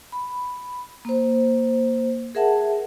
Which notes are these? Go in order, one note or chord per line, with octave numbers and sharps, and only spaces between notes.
B5
A#3 C5
G#4 A#4 E5 F#5 A5